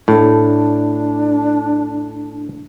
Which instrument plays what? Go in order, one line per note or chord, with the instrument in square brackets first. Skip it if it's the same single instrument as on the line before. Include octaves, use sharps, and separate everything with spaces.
[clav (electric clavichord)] A2 [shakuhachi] D4